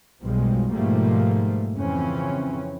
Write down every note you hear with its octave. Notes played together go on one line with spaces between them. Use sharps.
B1 F#2 B2 F3 G3 G#3
G#2 B2 F3 G3 A3 A#3
F2 C#3 E3 C4 C#4